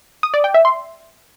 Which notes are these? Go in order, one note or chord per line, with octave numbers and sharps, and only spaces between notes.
D#6
D5
G5
E5
C6